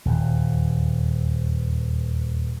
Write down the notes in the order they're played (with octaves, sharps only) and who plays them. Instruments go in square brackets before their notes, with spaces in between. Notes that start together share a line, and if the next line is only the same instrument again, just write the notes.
[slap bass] D#1 E2